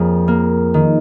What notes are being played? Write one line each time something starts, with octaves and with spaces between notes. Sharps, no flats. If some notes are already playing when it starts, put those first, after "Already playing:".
Already playing: F2 A#3 G#4 C#5
A#3
D#3